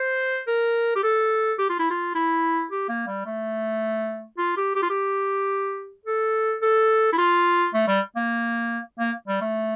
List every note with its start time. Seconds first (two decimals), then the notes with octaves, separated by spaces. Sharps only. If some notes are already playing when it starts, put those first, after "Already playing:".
Already playing: C5
0.47 A#4
0.96 G4
1.03 A4
1.59 G4
1.70 F4
1.79 E4
1.90 F4
2.15 E4
2.71 G4
2.89 A#3
3.07 G3
3.26 A3
4.38 F4
4.57 G4
4.75 G4
4.82 F4
4.90 G4
6.06 A4
6.62 A4
7.13 E4
7.18 F4
7.74 A3
7.88 G3
8.16 A#3
8.99 A#3
9.28 G3
9.41 A3